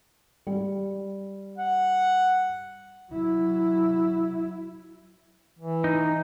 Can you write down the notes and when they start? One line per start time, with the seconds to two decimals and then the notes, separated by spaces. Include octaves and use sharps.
0.47 G3
1.58 F#5
3.12 F#3 E4
5.59 E3
5.84 D#4